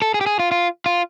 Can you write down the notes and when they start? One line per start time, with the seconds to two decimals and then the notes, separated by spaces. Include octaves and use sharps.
0.02 A4
0.14 G#4
0.21 G4
0.26 G#4
0.39 F4
0.52 F4
0.86 F4